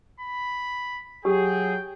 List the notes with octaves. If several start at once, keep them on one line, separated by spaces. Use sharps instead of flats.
B5
F#3 G4 G#4 G5